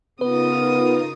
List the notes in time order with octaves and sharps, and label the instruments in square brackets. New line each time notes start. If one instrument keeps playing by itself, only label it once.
[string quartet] C#3 D#6 [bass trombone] B3 [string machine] D#4 F4 A#4 [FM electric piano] B4